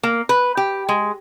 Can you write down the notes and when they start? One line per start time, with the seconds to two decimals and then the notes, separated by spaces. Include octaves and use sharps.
0.03 A#3
0.29 B4
0.57 G4
0.89 G#3